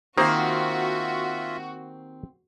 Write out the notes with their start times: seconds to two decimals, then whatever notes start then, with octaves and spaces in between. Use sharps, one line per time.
0.18 D#3 A#3 C4 F4 F#4 C5 E5